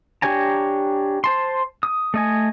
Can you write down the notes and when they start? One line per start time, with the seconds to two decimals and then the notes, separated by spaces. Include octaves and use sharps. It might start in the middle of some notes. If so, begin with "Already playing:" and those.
0.22 D4 G4 C#5 G#5 A#5
1.24 C5 A5 C6
1.83 D#6
2.14 A3 D#5 G#5